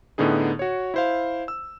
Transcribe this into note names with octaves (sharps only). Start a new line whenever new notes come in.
A2 D3 B3 D#4 G#4
F#4 C#5
E4 C5 F5
E6